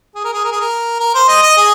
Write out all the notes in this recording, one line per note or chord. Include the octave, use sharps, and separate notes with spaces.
G#4
A#4
G#4
A#4
G#4
A#4
A#4
C5
D#5
D#5
G#4